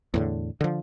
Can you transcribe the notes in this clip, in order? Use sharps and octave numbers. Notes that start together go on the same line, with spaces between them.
E2 A2 D3
D3 F3